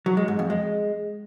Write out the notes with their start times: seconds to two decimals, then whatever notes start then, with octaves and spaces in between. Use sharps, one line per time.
0.06 F#3
0.17 G#3
0.28 G#2
0.39 F2
0.50 G#3